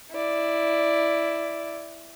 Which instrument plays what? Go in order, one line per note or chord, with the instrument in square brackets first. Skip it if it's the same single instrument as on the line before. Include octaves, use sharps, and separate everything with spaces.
[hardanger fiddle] E4 D5